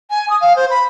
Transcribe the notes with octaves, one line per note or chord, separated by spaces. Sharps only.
G#5
D#6
F5
C5
B5